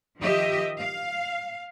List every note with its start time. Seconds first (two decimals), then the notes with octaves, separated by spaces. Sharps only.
0.19 D#3 F3 G4 D#5 E5
0.79 F5